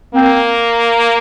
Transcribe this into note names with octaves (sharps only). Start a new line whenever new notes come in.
A#3 C4